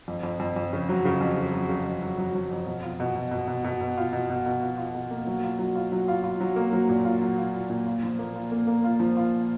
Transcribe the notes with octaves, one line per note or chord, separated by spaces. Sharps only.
F2
F2
F2
F2
C#3
F#3
C#3
F2
C#3
F#3
C#3
F2
F#3
F#3
F#3
F2
B2
F4
B2
B2
B2
B2
B2
B2
F4
B2
B2
B2
F4
F4
B2
A#3
F#3
F4
F#3
F4
F#3
F4
F4
F#3
A#3
F#3
A#2
F4
F#3
F4
F4
A#2
F4
F3
A#3
F4
A#3
A#3
F4
F3
F4